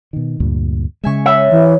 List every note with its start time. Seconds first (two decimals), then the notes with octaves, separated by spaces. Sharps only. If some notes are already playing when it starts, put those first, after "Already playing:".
0.13 B2 D#3
0.40 D2 G2 A#2
1.04 C#3 G#3 E5 G#5 C#6
1.26 C#5 E5 F#5 B5
1.50 E3